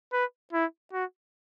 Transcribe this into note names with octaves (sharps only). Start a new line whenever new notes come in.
B4
E4
F#4